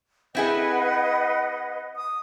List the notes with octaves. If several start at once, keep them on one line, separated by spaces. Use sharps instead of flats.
C4 E4 G#4 B4 D#5 F#5
D#6